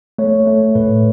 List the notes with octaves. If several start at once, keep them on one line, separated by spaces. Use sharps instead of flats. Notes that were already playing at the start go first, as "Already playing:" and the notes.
A3 C#5
A3
A2 B4